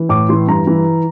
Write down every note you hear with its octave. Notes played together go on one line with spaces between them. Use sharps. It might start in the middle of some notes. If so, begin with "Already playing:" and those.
Already playing: E3
A2 D6
E3 C6
G2 A#5
E3